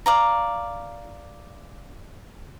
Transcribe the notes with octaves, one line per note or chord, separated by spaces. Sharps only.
D5 F5 A#5